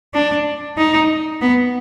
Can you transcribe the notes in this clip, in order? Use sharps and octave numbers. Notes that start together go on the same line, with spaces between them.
D4
D#4
B3